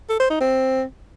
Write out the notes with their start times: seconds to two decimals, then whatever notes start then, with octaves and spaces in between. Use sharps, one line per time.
0.09 A4
0.20 C5
0.30 D#4
0.40 C4